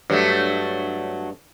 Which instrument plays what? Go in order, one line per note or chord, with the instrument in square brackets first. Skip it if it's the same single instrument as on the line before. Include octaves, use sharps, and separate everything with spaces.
[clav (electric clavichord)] G2 [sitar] F#3 A3